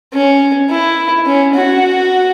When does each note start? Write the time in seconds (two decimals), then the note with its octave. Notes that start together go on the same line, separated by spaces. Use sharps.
0.13 C#4
0.70 E4
1.27 C#4
1.55 F#4